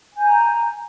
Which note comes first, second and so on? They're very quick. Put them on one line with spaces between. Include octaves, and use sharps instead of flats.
G#5 G6 A#5